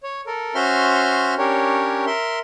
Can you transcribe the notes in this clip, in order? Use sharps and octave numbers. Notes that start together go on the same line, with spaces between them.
C#5
A4 A#4
C#4 F#4 C5 E5 C6 F6
C#4 D4 G4 A#4 C#5
A#4 E5 C6